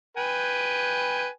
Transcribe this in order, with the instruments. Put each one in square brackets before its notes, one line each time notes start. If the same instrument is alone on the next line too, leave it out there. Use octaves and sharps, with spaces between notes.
[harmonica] B4 G5 G#5